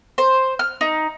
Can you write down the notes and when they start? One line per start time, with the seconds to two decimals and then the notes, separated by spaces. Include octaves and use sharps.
0.18 C5
0.59 F6
0.81 D#4